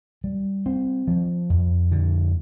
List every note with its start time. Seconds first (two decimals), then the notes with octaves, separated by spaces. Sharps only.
0.24 G3
0.66 C4
1.08 F3
1.50 F2
1.91 D3